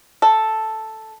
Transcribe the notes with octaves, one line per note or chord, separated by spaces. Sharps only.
A4